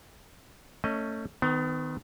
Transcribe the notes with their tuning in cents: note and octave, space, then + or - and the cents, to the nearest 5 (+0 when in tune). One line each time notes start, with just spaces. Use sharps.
A3 +25 C#4 +0 D#5 +0
D#3 +0 B3 +40